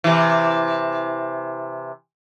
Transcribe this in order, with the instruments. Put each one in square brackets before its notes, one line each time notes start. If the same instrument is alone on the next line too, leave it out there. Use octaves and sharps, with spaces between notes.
[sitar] C3 E3